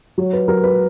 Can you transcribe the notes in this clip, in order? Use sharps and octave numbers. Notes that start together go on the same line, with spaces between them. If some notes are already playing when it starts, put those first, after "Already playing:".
F#3 C#5
B4
F#3 A#4
B4